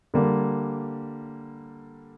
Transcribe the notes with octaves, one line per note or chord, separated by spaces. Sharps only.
D3 G3 A#3